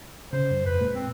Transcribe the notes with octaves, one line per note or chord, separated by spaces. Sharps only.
C#3 C5
F#2
F2 B4
A#2 G#3 A#3
C4